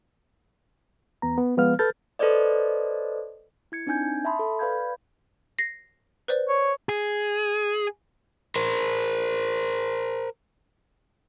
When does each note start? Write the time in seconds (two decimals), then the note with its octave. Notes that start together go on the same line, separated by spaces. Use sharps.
1.22 E2 B3 A#5
1.38 B3
1.57 F3 G#3 B3 B4 F5 F6
1.79 A4 B4 F6 G6 A6
2.19 A4 B4 C5 D5 D#5
3.72 E4 G#6 C#7
3.87 C4 D4 D#4 G#5 G6 G#6
4.25 E5 A5 B5 C6 D#6
4.39 A4
4.59 B4 D5 F5 B5 G6 G#6
5.59 A#6 C7
6.28 B4 C5 D5
6.48 C#5
6.89 G#4
8.56 A#4 C5